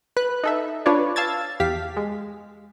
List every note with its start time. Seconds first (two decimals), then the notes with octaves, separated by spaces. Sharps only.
0.17 B4 F#6
0.44 D#4 A4 E5
0.86 D4 F4 B4 C#5 D5
1.16 F5 A5 E6 G#6 A6
1.60 E2 G4 F5 B6
1.97 G#3